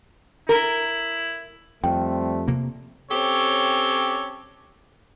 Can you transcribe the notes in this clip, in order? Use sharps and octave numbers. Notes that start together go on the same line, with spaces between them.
E4 A#4
F2 G3 A3 C4 G5
C3 A#3
C4 C#4 G4 A4 C#5